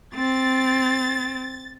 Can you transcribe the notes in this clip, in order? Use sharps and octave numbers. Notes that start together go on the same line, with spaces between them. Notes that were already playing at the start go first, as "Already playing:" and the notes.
C4 A6